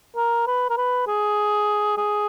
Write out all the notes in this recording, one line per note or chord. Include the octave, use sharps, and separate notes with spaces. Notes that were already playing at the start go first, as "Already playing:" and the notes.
A#4
B4
A#4
B4
G#4
G#4